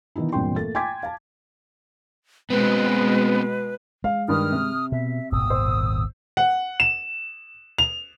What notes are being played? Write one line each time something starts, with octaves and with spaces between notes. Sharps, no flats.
D#3 E3 B3 D#4 E4
E1 G2 A#2 C4 G5 C6
A3 A#3 A6
G5 G#5 C6 D6 G#6 B6
F5 A5
B2 G#3 B3 C4 B4
G#3 F5
G2 D#3 D#6 F6
C3
B2 E5
D#1 G#1 B2 D#6 E6
C5
F#5
E7
F7